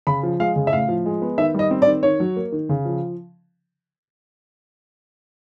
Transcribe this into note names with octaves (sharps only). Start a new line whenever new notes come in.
C#3 B5
F3
G#3 F5
C#3
E5
A2 F5
F3
G#3
B3
D#3 E5
G3 D#5
C4
D5
D#3
D#3 C#5
F#3
A#3
D#3
C#3
F3